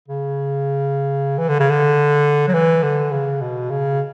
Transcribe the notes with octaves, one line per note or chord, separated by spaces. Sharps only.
C#3
E3
D3
C#3
D3
F#3
E3
D3
C#3
B2
C#3